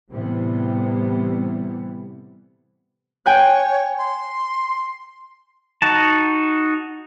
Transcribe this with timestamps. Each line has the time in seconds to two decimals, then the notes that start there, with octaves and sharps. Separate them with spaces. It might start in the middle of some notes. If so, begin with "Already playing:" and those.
0.10 A2 C3 E3 G3 B3
3.26 C#5 G5 G#5 F#6
3.98 C6
5.82 D#4 F#4 A5